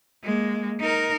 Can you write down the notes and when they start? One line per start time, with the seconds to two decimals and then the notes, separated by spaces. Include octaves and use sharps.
0.24 G#3 A#3
0.81 D#4 A#4